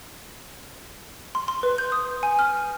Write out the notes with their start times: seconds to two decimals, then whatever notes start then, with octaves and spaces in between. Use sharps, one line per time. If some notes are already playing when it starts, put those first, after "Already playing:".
1.35 C6
1.48 C6
1.63 B4
1.78 G6
1.92 D#6
2.23 G#5
2.39 F6